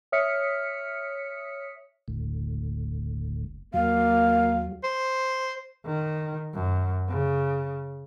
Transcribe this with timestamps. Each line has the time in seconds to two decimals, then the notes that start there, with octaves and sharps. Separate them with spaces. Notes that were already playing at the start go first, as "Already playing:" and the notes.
0.12 C#5 E5 D#6 F6 B6 C#7
2.08 F#1 D2 A2
3.74 D#2 F#3 A#3 F5
4.84 C5
5.86 D#3
6.54 F#2
7.09 C#3